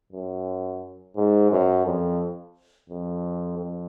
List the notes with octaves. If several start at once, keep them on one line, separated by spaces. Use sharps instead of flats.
F#2
G#2
F#2
F2
F2
F2